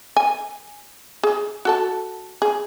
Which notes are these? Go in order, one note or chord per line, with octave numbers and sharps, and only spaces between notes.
G#5
G#4
F#4 A4 A5
G#4